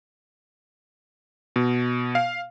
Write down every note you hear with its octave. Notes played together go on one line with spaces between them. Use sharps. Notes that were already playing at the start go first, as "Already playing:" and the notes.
B2
F5